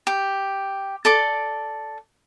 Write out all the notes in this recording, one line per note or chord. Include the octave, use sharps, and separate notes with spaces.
G4
A4 D5 D6